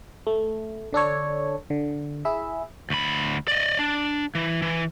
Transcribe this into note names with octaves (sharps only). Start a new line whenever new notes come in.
A3
D3 D4 A4 C#5
D3
E4 G#4 E5
D2 B5
D5 D#5
D4
E3
E3